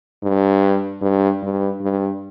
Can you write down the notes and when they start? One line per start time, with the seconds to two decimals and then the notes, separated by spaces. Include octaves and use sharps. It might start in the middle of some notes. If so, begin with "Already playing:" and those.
0.23 G2
1.02 G2
1.43 G2
1.81 G2